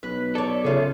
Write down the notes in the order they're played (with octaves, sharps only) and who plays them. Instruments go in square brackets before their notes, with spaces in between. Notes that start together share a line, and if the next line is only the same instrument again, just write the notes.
[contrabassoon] B1 [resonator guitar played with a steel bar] B4
[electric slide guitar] A4 [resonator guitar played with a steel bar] C#5 D5
[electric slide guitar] C#3 [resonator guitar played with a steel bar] F4 G#4 [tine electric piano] A4 C#5 E5